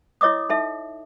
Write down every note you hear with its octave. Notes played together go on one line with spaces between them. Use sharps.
E4 C#5 D#5 D6 D#6
D#4 A4 E5